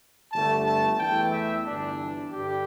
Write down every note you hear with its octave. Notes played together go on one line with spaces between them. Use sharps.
G1 G2 D3 A3 A5
A5
E2 E3 A3 G5
E5
G1 G2 E3 D4
G2 D3 G3 G4